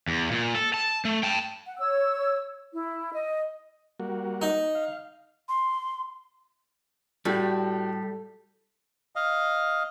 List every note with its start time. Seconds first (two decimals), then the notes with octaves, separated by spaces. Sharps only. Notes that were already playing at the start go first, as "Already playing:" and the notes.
0.08 E2
0.31 A#2
0.55 A4
0.74 A5
1.05 A3
1.23 G5 A5
1.65 F#5
1.78 C#5 E6
2.72 E4
3.13 D#5
4.00 G3 A#3 F#4
4.42 D#4
4.75 F5
5.49 C6
7.25 A2 G3 F#4 G4
9.16 D#5 F5